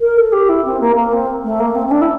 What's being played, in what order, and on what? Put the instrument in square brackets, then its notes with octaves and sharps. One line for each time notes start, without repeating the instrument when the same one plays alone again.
[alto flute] A#4
A4
G4
E4
C4
A#3
A#3
C4
A3
A#3
C4
C4
D4
E4